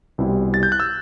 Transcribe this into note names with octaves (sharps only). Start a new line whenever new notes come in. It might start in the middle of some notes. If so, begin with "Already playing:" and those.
C2 B2 G3 C4 E4
A6
G6
F#6
E6